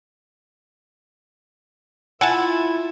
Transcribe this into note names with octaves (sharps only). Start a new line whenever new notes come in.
E4 F4 E5 F#5 G#5 A5